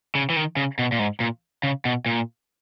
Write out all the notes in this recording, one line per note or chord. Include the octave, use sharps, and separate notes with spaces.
C#3
E3
D#3
C#3
B2
A#2
G#2
A#2
C#3
B2
A#2